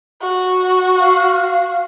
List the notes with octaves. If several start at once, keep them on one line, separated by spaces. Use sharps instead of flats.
F#4
F5